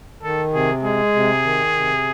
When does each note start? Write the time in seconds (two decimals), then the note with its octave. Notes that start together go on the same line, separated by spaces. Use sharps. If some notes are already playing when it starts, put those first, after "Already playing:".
0.23 D#3 A4
0.53 C3 G#4
0.83 G#3 G#4
1.14 C3
1.44 D#3
1.74 C3